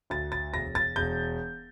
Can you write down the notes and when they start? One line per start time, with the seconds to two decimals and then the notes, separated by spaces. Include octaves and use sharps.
0.10 D2 A6
0.32 A6
0.53 E1 A#6
0.75 A6
0.96 E1 G6